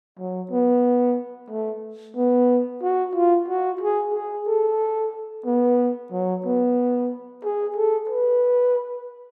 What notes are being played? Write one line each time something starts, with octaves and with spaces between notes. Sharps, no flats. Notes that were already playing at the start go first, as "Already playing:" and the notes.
F#3
B3
A3
B3
F#4
F4
F#4
G#4
G#4
A4
B3
F#3
B3
G#4
A4
B4